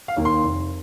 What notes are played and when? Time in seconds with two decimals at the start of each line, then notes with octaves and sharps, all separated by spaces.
0.08 F5
0.17 D#2 D#3 A#3
0.25 C6
0.42 F1